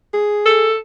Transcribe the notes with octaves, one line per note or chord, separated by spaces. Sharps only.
G#4
A4